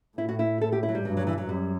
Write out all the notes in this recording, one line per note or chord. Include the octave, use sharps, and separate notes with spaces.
A2 E4
F#4
E4
A4
G4
E4
F#3
G3
G2 F#3
F#3
E3
F#3
F#2 G3